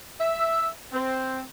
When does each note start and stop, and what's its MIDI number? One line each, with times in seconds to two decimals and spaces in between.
0.20 0.67 76
0.92 1.42 60